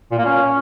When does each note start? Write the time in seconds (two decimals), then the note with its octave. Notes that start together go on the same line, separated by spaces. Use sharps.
0.11 A#2
0.18 A#3
0.25 C#4